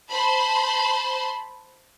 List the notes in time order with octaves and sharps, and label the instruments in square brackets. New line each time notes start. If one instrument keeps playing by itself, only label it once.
[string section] C5 A5 B5 C6